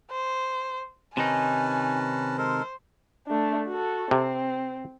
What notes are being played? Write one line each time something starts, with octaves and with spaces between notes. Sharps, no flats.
C5
C3 D#3 C#4 D#4 B4 G#5 A5
G#3 A4 A#4 C5
A3 D4
F#4 A4
C3 C4